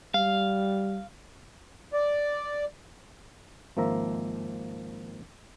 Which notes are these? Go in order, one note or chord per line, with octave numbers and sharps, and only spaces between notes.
G3 F5
D5
G#1 F3 A#3 E5 A#5